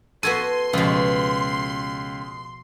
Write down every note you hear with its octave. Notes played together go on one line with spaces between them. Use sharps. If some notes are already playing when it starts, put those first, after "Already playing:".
B3 F#4 A4 C6 G#6 D#7
C#2 B2 F3